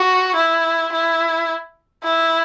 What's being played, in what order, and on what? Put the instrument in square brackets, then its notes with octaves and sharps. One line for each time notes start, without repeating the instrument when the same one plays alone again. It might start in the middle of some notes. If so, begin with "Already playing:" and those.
Already playing: [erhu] F#4
E4
E4
E4